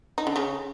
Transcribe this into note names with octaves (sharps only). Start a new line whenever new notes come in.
D#4
D3
C#3